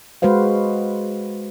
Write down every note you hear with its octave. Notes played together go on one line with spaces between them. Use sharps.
G#3 F#4 B4 C5 F5